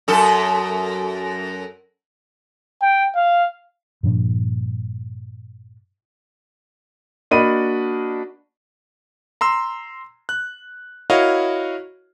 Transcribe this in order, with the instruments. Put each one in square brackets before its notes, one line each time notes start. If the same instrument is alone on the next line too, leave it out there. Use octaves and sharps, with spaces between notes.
[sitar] F#2 A4
[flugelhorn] G5
F5
[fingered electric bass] G2 A#2 F3 D4
[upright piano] A#3 D4 F#4 D#5 B5 D#7
[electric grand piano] A#5 C6 E6
F#6
E4 F#4 A#4 C#5 D#5 F5